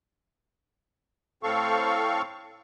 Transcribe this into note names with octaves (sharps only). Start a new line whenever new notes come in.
A2 C4 A4 F5 C#6